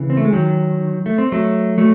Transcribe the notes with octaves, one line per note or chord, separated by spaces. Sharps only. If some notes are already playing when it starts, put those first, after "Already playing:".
Already playing: C#3 E3
C4
A3
G#3
D#3 F#3
A3
C4
F#3 A3
F#3 A3